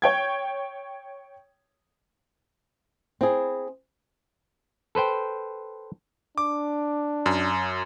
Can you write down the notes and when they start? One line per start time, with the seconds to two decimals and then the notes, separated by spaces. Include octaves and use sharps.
0.02 C#5 G5 G#6
3.21 C4 E4 G#4
4.95 A4 B4 C5 G5
6.38 D4 D6
7.26 F#2